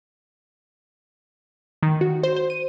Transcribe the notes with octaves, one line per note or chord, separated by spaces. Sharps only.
D#3
F#4
C5
C5
D#7